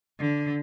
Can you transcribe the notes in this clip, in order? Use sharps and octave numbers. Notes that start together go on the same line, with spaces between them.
D3